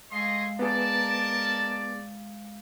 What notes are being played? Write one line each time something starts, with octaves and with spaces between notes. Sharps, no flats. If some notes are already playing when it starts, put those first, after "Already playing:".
G#3 A3 G#4 D#5 F5 C6
B3 D#4 G#4 A#4 D5 A5